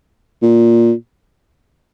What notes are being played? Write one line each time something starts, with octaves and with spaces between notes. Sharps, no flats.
A#2